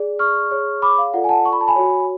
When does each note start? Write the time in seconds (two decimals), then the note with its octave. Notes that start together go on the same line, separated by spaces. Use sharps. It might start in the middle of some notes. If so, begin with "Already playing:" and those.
Already playing: G#4 D5
0.19 C#6 F6
0.51 G#4 C#5
0.82 B5 D6
0.98 F5
1.13 F4 A4 D5 F#5
1.24 G#5
1.29 F#5 A5
1.45 C#6
1.53 B5
1.61 A5
1.68 G#5 B5
1.76 F#4 C#5